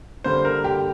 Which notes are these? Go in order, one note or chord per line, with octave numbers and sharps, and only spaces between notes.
D3 G3 A#3 C5
A#4
G4